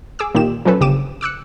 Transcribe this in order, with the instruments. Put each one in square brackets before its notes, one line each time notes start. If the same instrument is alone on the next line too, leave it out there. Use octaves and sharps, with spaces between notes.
[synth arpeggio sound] G#4 D6 E6
A#2 D#3 G4 E7
F3 F#3 C#4 A4 B4
G1 C#3 G4 D6 D#7 E7
D6 E6 F#6 C#7